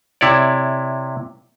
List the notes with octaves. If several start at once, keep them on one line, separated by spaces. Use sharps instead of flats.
C3 E4 C#5 D5